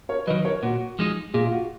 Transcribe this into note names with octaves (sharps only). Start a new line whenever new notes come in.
A#4 C#5
D#3 F#3 B4 D#5
A#4 C#5
A#2 F#4
F3 G#3 D#4
A#2 F4 G#4
F4
F#4